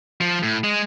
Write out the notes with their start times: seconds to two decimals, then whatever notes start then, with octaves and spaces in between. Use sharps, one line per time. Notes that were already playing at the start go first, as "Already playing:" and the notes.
0.21 F3
0.43 A2
0.64 G#3